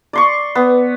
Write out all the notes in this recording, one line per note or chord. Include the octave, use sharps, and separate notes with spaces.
D5 C6 C#6
B3